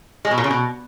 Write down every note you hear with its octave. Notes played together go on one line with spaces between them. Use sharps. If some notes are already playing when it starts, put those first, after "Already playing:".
G#3
B2
A#2
C#3
B2